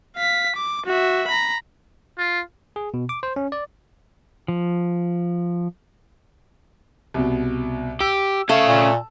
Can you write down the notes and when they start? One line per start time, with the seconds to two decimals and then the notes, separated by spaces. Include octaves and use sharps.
0.16 F5 B6
0.56 D6
0.86 F#4 E5
1.27 A#5 B5
2.18 F4
2.76 G#4
2.94 B2
3.09 D6
3.23 C5
3.36 C#4
3.52 D5
4.48 F3
7.14 C2 B2
8.01 G4 E6
8.49 A3 C#4 F5
8.66 A#2